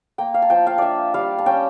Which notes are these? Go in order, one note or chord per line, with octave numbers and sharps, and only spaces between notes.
A#3 G5
F5
A5
F3 G5
F5
D4 D5 E5
G3 F5
A5
C#4 G5